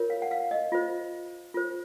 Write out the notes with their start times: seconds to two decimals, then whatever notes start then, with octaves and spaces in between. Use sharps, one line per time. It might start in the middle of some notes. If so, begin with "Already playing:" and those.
Already playing: F4 A#4 C#5
0.10 F5
0.22 F#5
0.31 F5
0.51 D#5
0.72 F4 C5
1.54 F4 C5